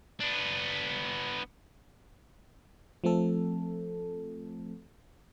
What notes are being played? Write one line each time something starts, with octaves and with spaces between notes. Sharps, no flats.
B3 D4
F3 A3 C4 A4